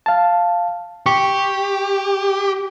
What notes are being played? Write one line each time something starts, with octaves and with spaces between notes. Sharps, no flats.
F5 A5
G4 C#6